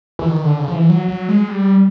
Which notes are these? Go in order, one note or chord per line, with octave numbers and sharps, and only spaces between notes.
E3
D#3
D3
C#3
F3
E3
F#3
F#3
G#3
G3